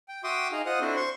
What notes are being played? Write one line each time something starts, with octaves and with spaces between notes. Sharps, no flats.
G5
F#4 E5 G5 C6 D6 D#6
D#4 G#4 D#5 F5
F4 C5 D#5 F#5 D#6
C4 D4 E4 F#4 A4 C5
C5 C6 C#6